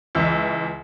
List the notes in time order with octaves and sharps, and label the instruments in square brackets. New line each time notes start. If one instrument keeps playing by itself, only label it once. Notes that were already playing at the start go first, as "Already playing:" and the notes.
[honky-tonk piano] C#2 E3 E6